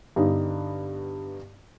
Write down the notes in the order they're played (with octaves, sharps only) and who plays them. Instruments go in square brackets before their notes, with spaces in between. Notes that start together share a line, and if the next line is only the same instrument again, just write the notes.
[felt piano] G2 D3 G3 B3 D#4